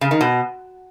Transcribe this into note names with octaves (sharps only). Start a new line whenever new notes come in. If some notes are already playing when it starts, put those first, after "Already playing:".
C#3
D#3
B2